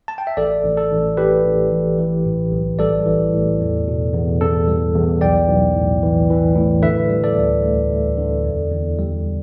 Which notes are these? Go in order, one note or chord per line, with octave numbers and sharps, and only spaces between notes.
A5
G5
E5
A1 A4 D5
A1
A4
A1
E3 G4 B4
A1
A1
E3
A2
B1
G3 A4 D5
E3
A2
E2
B2
E2
E2 A4
G3
E2
B1 D5 G5
B1
A2
E3
E3
A2
D3 B4 E5
G3
A4 D5
D2
D2
D2
D3
E2
E2
G3